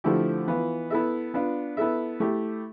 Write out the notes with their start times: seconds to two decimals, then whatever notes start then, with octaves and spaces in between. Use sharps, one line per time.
0.04 D3 F3 A3 E4 G4
0.48 E3 B3 F4
0.90 B3 E4 A4 E5
1.34 B3 D4 F4
1.77 B3 E4 A4 E5
2.20 A3 E4 G4